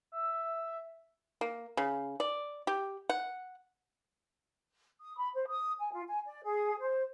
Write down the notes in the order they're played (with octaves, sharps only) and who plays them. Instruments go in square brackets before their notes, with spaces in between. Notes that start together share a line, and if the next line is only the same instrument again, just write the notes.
[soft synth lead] E5
[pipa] A#3
C#3
D5
G4
F#5
[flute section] D#6
B5
C5
D#6
G#5
F4
G#5
D5
G#4
C5